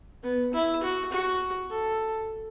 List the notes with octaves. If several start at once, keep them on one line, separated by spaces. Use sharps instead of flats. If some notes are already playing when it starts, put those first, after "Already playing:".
B3
E4
F#4
F#4
A4